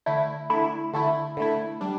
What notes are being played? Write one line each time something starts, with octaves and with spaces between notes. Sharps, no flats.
D3 A3 E4
D3 A3 E4
D3 A3 E4
D3 A3 E4
G3 D4